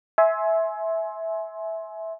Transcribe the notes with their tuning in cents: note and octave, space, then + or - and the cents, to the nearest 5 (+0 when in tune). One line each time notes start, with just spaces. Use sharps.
E5 -15 G#5 +20 C6 +10